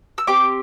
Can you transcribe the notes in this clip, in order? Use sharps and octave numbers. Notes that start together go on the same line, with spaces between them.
E6
C4 G4 D6